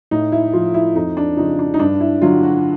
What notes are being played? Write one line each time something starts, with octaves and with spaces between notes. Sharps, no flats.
A2 D#4
E4
F3 F4
E4
F2 D#4
D4
C#3 F3 D#4
D4
D#4
G2 D4
E4
D3 F#3 F4
F#4